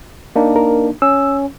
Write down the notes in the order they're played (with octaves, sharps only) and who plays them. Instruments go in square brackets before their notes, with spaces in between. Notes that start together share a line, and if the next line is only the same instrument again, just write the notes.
[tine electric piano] A#3 D4 D#4
[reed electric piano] A#4
[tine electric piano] C#4 [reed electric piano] E6